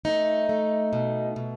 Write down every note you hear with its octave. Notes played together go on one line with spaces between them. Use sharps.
A3 D#4
A3
B2
B2